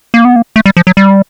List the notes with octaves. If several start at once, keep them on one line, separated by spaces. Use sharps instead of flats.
A#3
B3
A#3
A3
G3
F3
F#3
G3